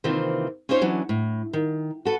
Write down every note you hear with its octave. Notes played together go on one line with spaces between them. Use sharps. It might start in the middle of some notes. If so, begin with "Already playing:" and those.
C3 D#3 E3 A#3 C4 F4
C#4 D#4 F4 C5 C#5
E3 F#3 C#4 D4
A2
D#3
F#4 A4 B4